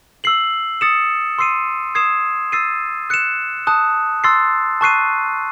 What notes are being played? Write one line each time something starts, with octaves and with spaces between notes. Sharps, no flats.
E6 C7 F#7
D#6 A6 C#7 E7
C6 E6 C7 D#7
D#6 G#6 C7 E7
E6 A6 C7 D#7
F#6 C#7 E7
A5 D#6 F#6
C6 E6 A6 C7
A5 C#6 F#6 C7 D#7